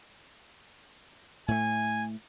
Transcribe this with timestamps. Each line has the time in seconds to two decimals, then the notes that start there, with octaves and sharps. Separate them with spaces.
1.48 A2 A3 G#5